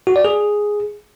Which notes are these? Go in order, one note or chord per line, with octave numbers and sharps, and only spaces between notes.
F#4
D5
G#4